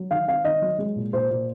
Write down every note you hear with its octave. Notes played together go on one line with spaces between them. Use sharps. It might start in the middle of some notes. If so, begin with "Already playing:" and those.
Already playing: F#3
D#3 F5
C4 F5
D#3 D#5
F#3
G#3
A#2
A#2 C5
A#2